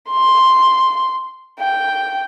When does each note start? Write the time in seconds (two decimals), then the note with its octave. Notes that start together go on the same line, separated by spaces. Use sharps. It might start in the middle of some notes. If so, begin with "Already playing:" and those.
0.11 C6
1.59 G5